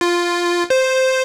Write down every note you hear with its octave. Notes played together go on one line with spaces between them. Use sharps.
F4
C5